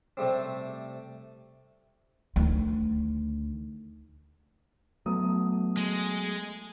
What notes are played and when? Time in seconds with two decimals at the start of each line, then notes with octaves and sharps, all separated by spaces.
0.17 C3 G3 A3 C4
2.36 D2 D#3
5.06 F#3 A3 B3 D#6
5.77 G#3